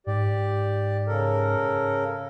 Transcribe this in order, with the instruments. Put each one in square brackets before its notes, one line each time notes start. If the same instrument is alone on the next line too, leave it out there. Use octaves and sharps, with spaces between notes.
[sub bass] G#2 [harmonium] G4 D5
[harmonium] C#3 A4 A#4